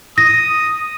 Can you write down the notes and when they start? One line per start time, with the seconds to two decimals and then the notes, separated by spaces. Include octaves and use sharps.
0.18 D#6 A#6